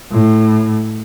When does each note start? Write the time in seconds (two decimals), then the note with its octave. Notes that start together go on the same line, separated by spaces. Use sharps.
0.12 A2